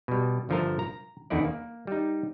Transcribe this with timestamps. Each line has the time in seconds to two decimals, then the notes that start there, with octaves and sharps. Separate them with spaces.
0.08 B2 G3
0.49 G1 D3 F3 A3 A#4 A5
0.79 A#5
1.30 E2 D3 D#4 E4 D5
1.45 A#3
1.87 G3 D#4